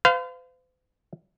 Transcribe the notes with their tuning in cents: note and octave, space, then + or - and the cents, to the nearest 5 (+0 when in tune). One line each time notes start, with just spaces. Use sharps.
C5 -45 F5 +0